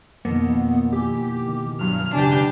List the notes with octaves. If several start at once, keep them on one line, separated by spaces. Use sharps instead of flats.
F2 B2 D#3 A#3 B3
E4 G4 G#5
D#3
G2 F#3 F6
C#2 F#2 C#3 D4 G4 B4 C#5 G#5